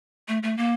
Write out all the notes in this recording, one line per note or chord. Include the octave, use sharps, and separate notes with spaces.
A3
A3
A#3